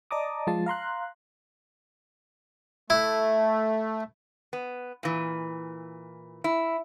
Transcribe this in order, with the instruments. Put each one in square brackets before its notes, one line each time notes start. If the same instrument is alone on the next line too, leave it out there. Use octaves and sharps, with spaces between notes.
[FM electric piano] D5 D#5 A5 A#5 D6 D#6
F3 G#3 F4 A5
F5 A#5 C6 F#6
[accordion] A3 [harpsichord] E4
[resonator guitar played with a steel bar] B3
A#2 E3
E4